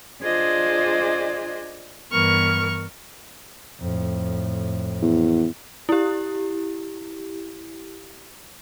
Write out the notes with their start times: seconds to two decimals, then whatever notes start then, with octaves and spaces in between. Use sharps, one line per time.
0.22 D4 F4 G#4 C5 D5 D#5
2.12 G2 E3 B3 A#4 C#6 F6
3.81 F2 A2
5.02 E2
5.89 E4 G4